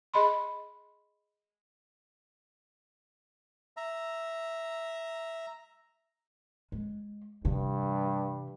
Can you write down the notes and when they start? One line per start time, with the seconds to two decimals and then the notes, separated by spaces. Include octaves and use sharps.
0.14 G#4 D#5 B5 C6
3.77 E5 A#5
6.72 G#3
7.45 G2 C3 E3